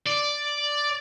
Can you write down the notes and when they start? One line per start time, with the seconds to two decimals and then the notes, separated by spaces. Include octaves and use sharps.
0.07 D5